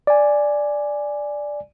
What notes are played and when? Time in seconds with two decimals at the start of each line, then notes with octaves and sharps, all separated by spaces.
0.07 D5 G#5